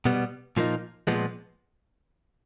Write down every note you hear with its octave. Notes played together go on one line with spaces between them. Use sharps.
B2 G3 B3
A#2 F3 A#3 D#4
A#2 F3 G#3 B3